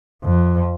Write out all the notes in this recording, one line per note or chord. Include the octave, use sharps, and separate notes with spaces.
F2